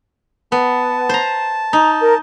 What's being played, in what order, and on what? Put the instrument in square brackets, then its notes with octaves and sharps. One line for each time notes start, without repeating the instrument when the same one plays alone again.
[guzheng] B3 [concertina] A5
[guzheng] C5 A#5
[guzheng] D#4 [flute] A#5
[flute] A#4